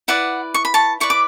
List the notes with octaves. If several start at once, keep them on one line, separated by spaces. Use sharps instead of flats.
E4 B4 D5 F#5
C#6
B5
A5 C#6
E4 B4 D5 C#6
D6